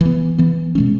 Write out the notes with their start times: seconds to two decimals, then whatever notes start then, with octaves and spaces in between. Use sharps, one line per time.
0.01 E3 B3
0.38 E3 B3
0.75 B2 G#3 C#4